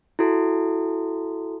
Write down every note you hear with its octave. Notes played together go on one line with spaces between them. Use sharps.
E4 F#4 A4